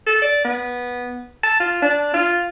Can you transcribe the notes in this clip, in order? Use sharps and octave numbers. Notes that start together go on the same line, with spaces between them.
A4
D5
B3
A5
F4
D4
F4